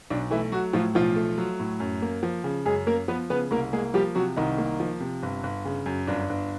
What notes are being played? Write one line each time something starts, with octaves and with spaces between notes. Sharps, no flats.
B1 D4
E3 A3 E4
F#3 F#4
A2 F3 F4
B1 F3 F4
A3
F#3
A2
F#2
A#3
F3
C#3
F#2 G#3 G#4
A#3 A#4
F3 B3 B4
C#3 B3 B4
C2 A#3 A#4
G#3 A#3 G#4
F3 G3 G4
C3 F#3 F#4
C2 D#3 D#4
A#3
F3
C3
G1
G1
C#3
F#2
G1 D4
G1